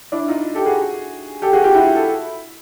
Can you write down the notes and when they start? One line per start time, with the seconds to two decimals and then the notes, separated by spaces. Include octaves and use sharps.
0.12 D4 E4
0.28 D#4 F4
0.55 G4 A4
0.66 F#4 G#4
1.42 G4 A4
1.53 F#4 G#4
1.64 F4 G4
1.74 E4 F#4
1.95 A4